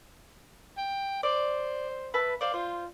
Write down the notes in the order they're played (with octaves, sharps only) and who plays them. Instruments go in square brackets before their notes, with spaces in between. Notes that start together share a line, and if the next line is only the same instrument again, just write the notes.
[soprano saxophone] G5
[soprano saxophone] C5 [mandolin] D5
[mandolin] B4 E5 A5
[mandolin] C5 D5 [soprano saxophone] F5
[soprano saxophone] F4 [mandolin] C5